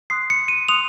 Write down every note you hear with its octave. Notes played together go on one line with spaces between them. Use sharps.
C6 D#6 F#6 C7
C#7
D#7
C6 D#6 F#6 F7